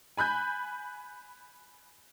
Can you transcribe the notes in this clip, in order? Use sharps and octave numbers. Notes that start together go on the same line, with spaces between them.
G#5 B5 F#6 G6